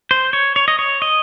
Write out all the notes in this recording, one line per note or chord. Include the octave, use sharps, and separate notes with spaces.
C5
C#5
C#5
D#5
C#5
D#5